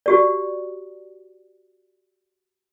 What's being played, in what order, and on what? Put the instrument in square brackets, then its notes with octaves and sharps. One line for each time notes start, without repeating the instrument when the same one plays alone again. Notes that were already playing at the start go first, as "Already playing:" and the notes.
[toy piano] F#4 G4 D5